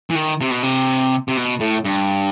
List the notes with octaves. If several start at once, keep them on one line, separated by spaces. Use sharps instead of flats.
E3
D#3
C3
B2
C3
C3
B2
A2
G2